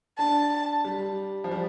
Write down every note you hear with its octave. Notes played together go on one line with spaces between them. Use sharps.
D4 A5
G3
F3
G3